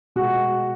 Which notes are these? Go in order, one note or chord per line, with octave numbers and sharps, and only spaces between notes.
B2 G#3 F#4